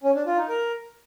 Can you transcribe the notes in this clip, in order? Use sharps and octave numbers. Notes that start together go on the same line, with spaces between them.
C#4
D4
F4
D#4
A#4